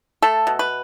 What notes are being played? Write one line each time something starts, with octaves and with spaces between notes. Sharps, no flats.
A3 A4
B2
B4